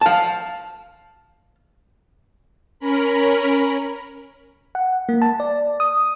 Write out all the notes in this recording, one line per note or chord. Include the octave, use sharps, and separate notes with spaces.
F5 A5
C#4 A#4 B5
F#5
A#3
A5
D5
D#6